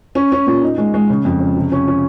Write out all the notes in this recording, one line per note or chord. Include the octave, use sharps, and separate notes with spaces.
C#4
C#4
A#2
D#4
G#3
G#3
C#3
F2
C#3
C3
C#4
C#4